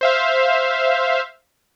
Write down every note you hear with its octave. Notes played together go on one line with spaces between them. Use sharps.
C5 E5 F5